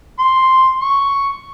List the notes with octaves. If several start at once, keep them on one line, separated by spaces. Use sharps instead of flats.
C6
C#6